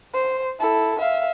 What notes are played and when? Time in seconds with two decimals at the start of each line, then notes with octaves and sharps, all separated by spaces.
0.14 C5
0.60 E4 A4
0.99 E5 F5